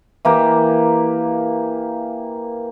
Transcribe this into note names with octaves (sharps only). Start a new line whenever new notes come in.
E3 A#3 G4